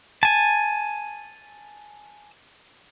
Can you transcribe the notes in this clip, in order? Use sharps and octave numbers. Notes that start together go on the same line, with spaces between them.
G#5 A5